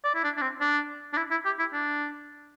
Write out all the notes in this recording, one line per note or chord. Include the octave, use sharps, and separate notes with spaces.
D5
E4
D4
D4
C4
D4
D4
E4
E4
G4
E4
D4